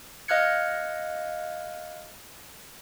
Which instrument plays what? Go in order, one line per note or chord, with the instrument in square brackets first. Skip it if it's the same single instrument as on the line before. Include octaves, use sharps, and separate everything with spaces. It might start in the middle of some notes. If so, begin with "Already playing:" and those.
[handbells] D#5 F5 F6 F#6 G#6 C#7